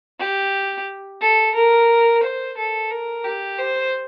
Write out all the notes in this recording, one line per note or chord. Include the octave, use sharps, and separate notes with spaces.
G4
A4
A#4
C5
A4
A#4
G4
C5